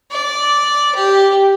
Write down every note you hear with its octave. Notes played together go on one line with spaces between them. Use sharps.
D5
G4